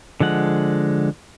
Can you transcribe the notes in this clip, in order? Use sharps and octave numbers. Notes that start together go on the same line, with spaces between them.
D3 F3 G#3 F#5